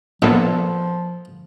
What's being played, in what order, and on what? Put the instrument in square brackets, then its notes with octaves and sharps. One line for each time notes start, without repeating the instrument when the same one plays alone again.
[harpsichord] A#1 [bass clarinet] F3 [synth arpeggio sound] A#3 B3 A4